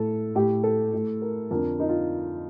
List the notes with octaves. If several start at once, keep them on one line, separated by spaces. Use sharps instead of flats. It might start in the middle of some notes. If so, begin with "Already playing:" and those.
Already playing: A2 A4
A2 G4
A4
A2
A#4
F2 D3 A#4
D#4
F4